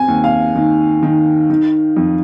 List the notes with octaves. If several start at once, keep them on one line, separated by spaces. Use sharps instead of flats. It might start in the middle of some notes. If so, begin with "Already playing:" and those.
Already playing: C4 G#5
D#2
F5
D#3
D#3
D#3
F2